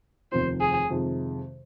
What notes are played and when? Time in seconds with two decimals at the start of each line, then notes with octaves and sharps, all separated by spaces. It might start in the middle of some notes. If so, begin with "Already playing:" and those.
0.32 F1 D#2 D#3 C4 F4 C5
0.60 G#4
0.90 F2 C3 D#3 G#3